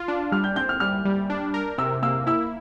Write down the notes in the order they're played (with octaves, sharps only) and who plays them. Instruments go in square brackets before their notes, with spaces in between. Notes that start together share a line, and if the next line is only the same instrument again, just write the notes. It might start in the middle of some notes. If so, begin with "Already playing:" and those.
Already playing: [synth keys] F4
D4
[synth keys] G3 [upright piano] F6
[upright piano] G6
[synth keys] C4 [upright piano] G6
[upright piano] F6
[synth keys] G3 [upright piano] F6
[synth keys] G3
D4
A#4
[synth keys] C3 [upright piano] E6
[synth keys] A#3 [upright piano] E6
[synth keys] E4 [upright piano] E6